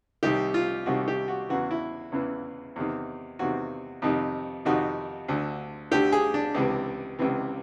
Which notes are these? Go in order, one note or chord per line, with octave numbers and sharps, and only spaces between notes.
C2 C3 D#3 G4
F4
C2 C3 D#3 F#4
G4
F#4
E2 C#3 E3 F#4
E4
E2 C#3 E3
E2 C3 D#3
E2 C3 D#3 F#4
F2 C3 D#3
F2 C3 D#3 F#4
D2 D3
D2 D3 G4
G#4
D4
C#2 C3 E3
C#2 C3 E3